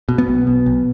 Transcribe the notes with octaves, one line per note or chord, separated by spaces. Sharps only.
B2
B3
B1
B2
B1